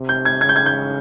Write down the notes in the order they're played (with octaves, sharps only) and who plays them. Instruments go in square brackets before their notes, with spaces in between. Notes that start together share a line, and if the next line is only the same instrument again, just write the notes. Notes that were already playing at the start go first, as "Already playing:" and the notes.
Already playing: [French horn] C3
[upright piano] G6
G#6
[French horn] C#3 [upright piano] G#6
[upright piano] G6
G#6
G6